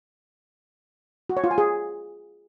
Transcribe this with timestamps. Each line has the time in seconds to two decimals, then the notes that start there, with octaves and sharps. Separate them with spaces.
1.29 F#4
1.37 C#5
1.44 F4
1.51 G#5
1.58 G#4